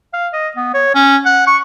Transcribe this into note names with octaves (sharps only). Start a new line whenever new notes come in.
F5
D#5
B3
C#5
C#4
F#5
C#6